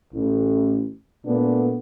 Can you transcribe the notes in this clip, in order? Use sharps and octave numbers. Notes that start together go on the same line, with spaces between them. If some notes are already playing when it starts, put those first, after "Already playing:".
A1
A#2 A3 B3 D4